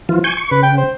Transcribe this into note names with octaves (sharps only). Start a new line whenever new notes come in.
E3 F3 F4
G#5 C#6 G6
C#6
C#3 B4
G5
C5